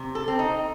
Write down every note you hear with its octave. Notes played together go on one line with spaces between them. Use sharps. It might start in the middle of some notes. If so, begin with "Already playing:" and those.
Already playing: C3
A4
C4
D#4